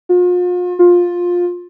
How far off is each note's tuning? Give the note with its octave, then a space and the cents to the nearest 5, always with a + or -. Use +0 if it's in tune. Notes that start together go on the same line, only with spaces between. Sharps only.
F4 +40
F4 +15